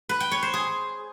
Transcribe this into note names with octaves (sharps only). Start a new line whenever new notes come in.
B4
G5
C#5
C5
G#4